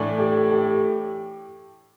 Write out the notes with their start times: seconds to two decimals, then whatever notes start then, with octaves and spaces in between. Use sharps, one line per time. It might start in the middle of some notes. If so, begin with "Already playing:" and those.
Already playing: A2 E3 A3 D4
0.18 G4 A4
0.51 G4 A4